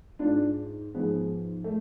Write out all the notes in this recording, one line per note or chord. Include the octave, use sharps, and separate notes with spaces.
G#2 G#3 D4 F4
G#2 F3 G#3 B3
A3